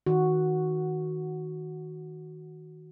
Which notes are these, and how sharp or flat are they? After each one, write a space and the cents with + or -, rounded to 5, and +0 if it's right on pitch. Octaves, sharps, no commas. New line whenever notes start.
D#3 +15 F#4 +0